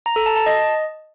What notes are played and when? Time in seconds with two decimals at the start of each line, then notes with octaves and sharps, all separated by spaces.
0.06 A#5
0.16 A4
0.26 A5
0.36 A5
0.46 D#5